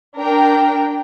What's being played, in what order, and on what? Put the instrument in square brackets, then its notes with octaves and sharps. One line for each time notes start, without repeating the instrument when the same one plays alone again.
[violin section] D4 A#4 G5